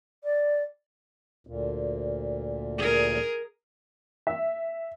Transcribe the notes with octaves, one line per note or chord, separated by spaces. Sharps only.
D5
D2 A#2
G#4 A#4
E5